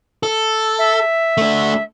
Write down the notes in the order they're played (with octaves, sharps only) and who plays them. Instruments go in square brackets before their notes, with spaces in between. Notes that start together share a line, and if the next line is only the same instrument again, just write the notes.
[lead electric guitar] A4
[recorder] E5
[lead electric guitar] A3 D4